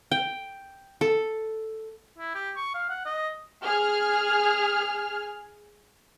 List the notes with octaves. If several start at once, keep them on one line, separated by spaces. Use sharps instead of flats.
G5
A4
E4
G4
C#6
F5
F#5
D#5
G#4 F6